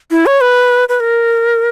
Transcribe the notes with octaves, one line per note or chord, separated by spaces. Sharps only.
E4
C#5
B4
B4
A#4